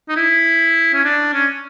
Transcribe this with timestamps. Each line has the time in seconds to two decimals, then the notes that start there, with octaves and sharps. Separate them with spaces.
0.09 D#4
0.17 E4
0.94 C#4
1.05 D4
1.34 C#4